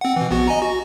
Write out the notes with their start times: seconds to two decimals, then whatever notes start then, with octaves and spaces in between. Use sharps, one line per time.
0.01 C4 F#5
0.16 B2 E3
0.31 A#1 B3 F#4
0.47 D#5 G#5 A#5
0.62 F#4